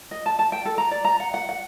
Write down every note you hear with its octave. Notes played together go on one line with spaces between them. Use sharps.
D#5
A5
A5
G5
A4
A#5
D5
A#5
F#5
F#5
F#5